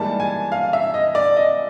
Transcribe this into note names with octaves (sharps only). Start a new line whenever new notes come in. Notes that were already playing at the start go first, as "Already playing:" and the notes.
Already playing: G#2 E3 G3 A#3 A5
G#5
F5
E5
D#5
D5
D#5